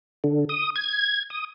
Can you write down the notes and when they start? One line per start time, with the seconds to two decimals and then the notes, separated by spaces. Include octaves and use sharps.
0.24 D3
0.49 D#6
0.76 G#6
1.30 D#6